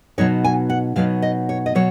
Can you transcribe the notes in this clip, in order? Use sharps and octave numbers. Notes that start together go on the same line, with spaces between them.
B2 F#3 B3 D#4 C#5
G#5
F#5
B2 F#3 B3 D#4 F5
D#5
C#5
D#5
B2 F#3 C#5